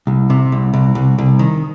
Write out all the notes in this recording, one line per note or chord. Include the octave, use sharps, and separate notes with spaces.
C2
C3
C2
C2
C2
C2
D#3